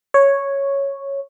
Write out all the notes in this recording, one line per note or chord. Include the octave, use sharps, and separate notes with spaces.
C#5